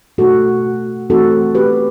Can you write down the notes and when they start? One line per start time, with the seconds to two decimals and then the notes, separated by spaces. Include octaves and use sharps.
0.18 B2 A3 D#4 F#4 A4
1.10 E3 A3 C4 D#4 F#4 A4
1.55 G4 B4